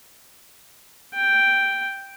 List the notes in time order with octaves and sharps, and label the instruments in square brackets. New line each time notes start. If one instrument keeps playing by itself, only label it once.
[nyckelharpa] G5